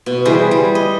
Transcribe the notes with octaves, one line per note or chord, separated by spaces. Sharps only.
B2
E3 G3 G#4 C5
G3
D#5